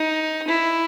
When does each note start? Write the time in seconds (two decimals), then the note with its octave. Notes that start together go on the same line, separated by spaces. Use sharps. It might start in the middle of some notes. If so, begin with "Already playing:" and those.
Already playing: D#4
0.47 E4